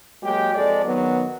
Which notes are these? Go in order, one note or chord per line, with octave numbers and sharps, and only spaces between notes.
F#3 G#3 A#3 G4
F2 G#3 A4 D5
D#3 F#3 B3